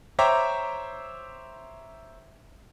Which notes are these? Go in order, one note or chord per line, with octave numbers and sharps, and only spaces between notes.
C5 C#5 E5 G5 A#5 D6